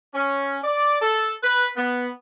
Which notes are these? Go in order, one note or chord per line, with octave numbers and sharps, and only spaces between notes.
C#4
D5
A4
B4
B3